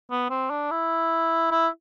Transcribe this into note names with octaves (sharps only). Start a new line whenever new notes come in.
B3
C4
D4
E4
E4